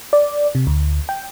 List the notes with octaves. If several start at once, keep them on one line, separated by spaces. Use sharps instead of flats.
D5
C3
D2
G5